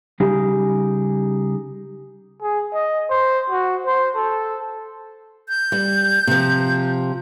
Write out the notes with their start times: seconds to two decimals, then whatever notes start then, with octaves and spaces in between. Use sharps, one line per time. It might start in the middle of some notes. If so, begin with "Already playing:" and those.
0.20 C#3 G3 D#4 G4 G#4
2.41 G#4
2.73 D#5
3.10 C5
3.50 F#4
3.86 C5
4.15 A4
5.49 G6
5.72 G3
6.27 C3 F3